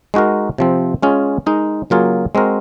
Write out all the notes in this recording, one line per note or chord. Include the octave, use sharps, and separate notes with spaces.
G#3 D#4 F#4 A#4
C3 F3 C4
G#3 C#4 F4 G#4
G#3 D#4 A#4
C#3 F#3 A#3 F4 G#4
G#3 C4 F#4 A#4